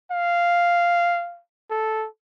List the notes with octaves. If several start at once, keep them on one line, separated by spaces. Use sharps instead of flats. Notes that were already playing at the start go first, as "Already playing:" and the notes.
F5
A4